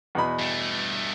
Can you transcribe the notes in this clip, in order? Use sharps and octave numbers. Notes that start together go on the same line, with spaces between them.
E2 B2 B5
G2 A3